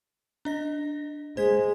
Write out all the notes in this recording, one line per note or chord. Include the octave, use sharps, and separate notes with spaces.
D4 D#5 A#6
G#3 C5 G#6 B6